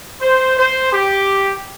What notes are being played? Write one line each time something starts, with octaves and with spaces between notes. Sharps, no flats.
C5
C5
G4